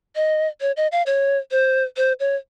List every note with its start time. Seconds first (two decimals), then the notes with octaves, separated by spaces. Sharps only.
0.16 D#5
0.61 C#5
0.77 D#5
0.92 F5
1.06 C#5
1.51 C5
1.97 C5
2.20 C#5